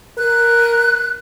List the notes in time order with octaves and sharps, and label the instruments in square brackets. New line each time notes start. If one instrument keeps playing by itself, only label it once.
[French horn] A#4 [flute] F#6